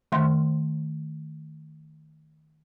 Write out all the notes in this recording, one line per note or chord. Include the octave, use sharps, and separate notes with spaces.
D#3 A3 E5 C6